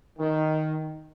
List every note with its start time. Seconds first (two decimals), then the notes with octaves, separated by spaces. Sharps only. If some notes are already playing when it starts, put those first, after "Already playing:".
0.18 D#3